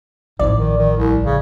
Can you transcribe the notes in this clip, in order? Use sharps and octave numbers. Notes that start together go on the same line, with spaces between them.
A1 G#2 F3 D5
D#3
D#3
C2
C#3